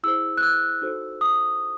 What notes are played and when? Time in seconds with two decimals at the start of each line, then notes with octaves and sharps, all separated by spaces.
0.03 E4 G#4 C5 E6
0.37 F#6
0.42 E6
0.82 D#4 F#4 A4 C5
1.21 D#6